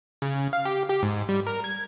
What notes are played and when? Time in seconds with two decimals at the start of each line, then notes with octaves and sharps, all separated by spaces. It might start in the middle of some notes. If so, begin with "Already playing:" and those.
0.22 C#3
0.53 F5
0.65 G4
0.89 G4
1.03 G#2
1.29 G3
1.47 A#4
1.64 G#6